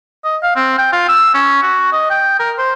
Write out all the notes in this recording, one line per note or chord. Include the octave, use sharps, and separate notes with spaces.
D#5
F5
C4
G5
F4
E6
C#4
F#4
D#5
G5
A#4
C5